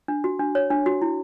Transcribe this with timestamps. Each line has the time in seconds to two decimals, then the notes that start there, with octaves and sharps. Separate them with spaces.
0.08 D4
0.24 F#4
0.39 D4
0.55 C#5
0.70 D4
0.86 F#4
1.02 E4